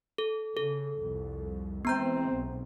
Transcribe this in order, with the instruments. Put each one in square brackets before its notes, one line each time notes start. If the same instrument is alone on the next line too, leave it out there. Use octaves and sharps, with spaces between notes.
[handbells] A4
[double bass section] C#3 [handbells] A4
[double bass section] C2 F2
[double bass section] E3 G#3 C4 [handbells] B3 A#5 G6
[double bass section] B1